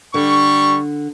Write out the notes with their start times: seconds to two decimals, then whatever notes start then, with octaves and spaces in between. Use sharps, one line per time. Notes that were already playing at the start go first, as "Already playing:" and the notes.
0.14 D3 G3 C#6